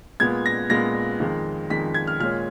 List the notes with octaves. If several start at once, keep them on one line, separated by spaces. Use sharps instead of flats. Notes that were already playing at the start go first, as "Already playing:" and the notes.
A#2 G#3 B3 G#6
A#6
A#2 G#3 B3 A#6
F2 D#3 G#3
F2 D#3 G#3 B6
G#6
F6
A#2 G#3 C#4 F6